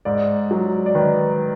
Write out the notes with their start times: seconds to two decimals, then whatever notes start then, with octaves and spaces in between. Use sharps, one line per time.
0.05 G#2 D5
0.51 F#3
0.86 D5
0.95 D#3 B4